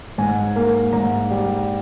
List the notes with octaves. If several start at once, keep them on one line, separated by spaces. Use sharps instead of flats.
G#2 G#5
A#3
G#2 A#5
G3